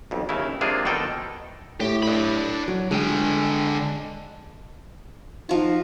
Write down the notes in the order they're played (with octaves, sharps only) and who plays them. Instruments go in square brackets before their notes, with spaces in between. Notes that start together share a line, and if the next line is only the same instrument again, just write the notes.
[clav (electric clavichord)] B1 F2
D#2 C#3 E4
C3 G#3 A#3 D4 F4 G#4
B2 D#3 D#4 A4 G5
[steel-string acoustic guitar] A2 [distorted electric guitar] G4
[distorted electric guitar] D4 B5
[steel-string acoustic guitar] F#3
[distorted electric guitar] D3 G5 [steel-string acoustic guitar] G#3
[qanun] F3 F#4 [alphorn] D#4